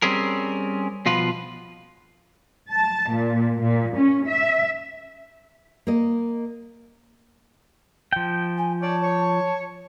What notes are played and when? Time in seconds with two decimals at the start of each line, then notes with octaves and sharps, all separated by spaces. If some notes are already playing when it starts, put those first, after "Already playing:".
0.02 G3 C4 C#4 G#4 A#4
1.06 B2 F3 F4 B4
2.71 A5
3.12 A#2
3.60 A#2
3.96 C#4
4.28 E5
5.87 A#3 D#5
8.13 F3 G5
8.57 G#5
8.81 C#5 D5 A5
9.02 C#5